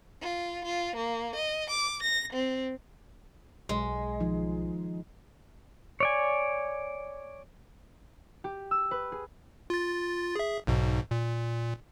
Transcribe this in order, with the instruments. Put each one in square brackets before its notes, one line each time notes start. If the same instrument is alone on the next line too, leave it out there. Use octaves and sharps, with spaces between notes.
[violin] F4
F4
A#3
D#5
D6
A#6
C4
[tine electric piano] B1 [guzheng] G#3
[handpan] D#3 F3 D#4
[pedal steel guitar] C#5 D5 G#5
[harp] G4
E6
B4
G#4
[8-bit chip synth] F4 A6
G#4 E5
B1 G#2 B2
A#2